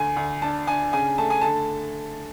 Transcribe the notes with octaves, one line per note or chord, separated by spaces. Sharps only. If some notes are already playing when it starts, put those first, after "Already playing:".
Already playing: D2 G#5
D2
D4 A5
D4 G#5
C#3 G#5
A3 A5
G#5
D3 A5